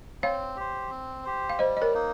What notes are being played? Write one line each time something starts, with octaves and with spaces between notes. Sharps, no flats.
C4 C#5 F5
G4 C5
C4
G4 C5
F5
G3 C5 D#5
D#5
A#4 C#5
A#3 D#4